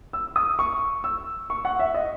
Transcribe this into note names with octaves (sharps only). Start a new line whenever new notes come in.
E6
D#6
C#6
E6
C#6
F#5
E5
D#5